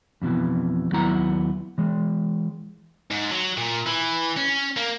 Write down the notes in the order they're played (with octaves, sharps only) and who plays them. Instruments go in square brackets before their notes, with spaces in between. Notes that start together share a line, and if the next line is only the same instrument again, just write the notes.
[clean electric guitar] F2 B2 D3 E3
D#2 F#3 B3 E4 A#5
E3 G#3
[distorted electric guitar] G#2
F#3
A#2
E3
C#4
A#3